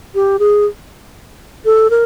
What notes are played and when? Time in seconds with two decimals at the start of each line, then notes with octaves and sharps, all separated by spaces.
0.15 G4
0.39 G#4
1.65 A4
1.90 A#4